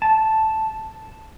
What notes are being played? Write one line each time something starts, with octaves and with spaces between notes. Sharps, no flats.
A5